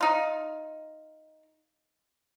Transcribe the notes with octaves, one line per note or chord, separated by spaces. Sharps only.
D#4 F4